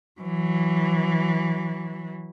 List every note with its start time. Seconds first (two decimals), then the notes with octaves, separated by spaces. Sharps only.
0.21 E3 F#3